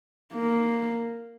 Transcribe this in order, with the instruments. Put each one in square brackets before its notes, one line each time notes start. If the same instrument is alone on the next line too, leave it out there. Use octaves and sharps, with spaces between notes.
[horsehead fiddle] A#3